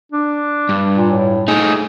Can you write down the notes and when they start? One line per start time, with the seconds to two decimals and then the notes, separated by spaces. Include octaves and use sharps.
0.12 D4
0.69 G2
0.97 A#2
1.10 A2
1.48 A3 D#4 G#4